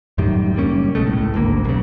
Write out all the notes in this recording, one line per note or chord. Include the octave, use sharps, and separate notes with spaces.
F#2 A2 D#3 G3
F#1 G3 A#3 C#4
B1 B2 G#3 A3
C#2 A2
G#1 D2 A#3
B1 C#3